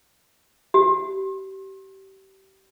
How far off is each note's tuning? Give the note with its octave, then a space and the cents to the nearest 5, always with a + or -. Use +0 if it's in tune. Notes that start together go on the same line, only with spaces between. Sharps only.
G4 -30